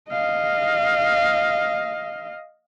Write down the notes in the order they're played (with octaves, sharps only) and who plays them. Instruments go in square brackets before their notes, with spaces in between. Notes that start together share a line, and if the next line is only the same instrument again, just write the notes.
[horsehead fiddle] D#5 F5